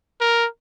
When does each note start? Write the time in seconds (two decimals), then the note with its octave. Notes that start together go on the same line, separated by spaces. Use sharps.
0.21 A#4